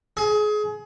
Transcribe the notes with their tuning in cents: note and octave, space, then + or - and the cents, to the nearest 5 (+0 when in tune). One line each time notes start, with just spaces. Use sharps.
G#4 +25